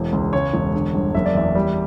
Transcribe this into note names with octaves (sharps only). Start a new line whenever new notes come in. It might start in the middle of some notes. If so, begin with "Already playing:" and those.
Already playing: E1 E3
C#2
C#3 C#5
E1
D3
G1
F#1 E5
D5
E2 E5
G3